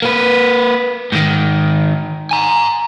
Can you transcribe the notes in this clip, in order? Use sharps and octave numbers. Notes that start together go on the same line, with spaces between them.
A#3 B4
G#2 D#3
G#5 A#5